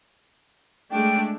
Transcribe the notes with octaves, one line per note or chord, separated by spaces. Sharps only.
G#3 A3 D4 G5